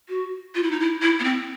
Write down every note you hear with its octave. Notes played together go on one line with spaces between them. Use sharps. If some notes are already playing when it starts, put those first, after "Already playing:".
F#4
F4
E4
D#4
E4
E4
B3
C4